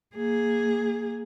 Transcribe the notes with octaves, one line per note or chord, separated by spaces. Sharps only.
A#3 G#4